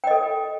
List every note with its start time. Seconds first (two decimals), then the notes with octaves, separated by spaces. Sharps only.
0.04 G5
0.07 D#5
0.11 A4